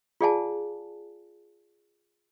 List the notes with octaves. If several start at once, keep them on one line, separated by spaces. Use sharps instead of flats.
F4 G#4 D5 F5 G#5 A5